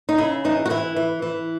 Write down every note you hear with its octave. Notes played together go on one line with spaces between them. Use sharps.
D#4
C#3 E4
E3 D#4
F#4
E3 E4
E3
E3